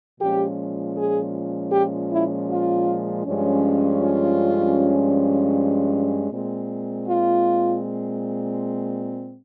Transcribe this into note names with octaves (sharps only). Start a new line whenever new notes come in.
A#2 F3 G#3 C#4 G4
G#4
G4
E4
F4
G2 F3 G#3 C#4
F4
A#2 G#3 C4
F4